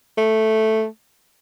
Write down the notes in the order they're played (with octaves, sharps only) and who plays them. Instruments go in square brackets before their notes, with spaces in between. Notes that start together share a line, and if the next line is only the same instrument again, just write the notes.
[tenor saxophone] A3